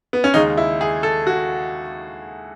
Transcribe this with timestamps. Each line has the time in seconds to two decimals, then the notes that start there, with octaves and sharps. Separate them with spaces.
0.13 B3
0.24 C#4
0.34 D#2 C#3 G#3 D#4
0.57 E4
0.81 G#4
1.03 A4
1.27 F#4